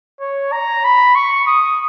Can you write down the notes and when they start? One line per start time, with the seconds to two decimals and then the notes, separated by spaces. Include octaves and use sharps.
0.21 C#5
0.52 A#5
0.84 B5
1.16 C#6
1.47 D#6